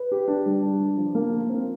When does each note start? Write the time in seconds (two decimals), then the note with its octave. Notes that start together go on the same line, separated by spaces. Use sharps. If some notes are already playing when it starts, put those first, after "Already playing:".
Already playing: B4
0.12 G4
0.28 D4
0.46 G3
0.63 D4
0.81 D4
0.97 F3
1.15 A#3
1.32 F4
1.49 C4